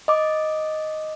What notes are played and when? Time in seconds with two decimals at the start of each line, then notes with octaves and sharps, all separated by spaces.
0.08 D#5 D6